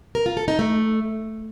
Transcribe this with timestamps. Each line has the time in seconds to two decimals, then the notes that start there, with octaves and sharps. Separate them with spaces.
0.15 A#4
0.26 F4
0.37 A4
0.48 D#4
0.59 A3